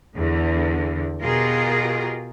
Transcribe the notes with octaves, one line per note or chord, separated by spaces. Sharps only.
E2 D3
B2 F4 G4 G#4 A#4